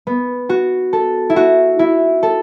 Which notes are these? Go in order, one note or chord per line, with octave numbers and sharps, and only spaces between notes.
B3
F#4
A4
E4
F#4
E4
A4